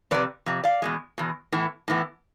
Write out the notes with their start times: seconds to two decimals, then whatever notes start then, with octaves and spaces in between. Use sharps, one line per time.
0.11 F2 C3 F3 B3 B4 D5
0.46 F2 C3
0.64 D5 F5
0.82 E2 B2 G#3
1.18 E2 B2
1.52 A2 E3 B3
1.88 A2 E3 B3